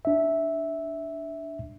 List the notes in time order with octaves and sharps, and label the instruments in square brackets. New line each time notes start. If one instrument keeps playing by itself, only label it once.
[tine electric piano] D4 E5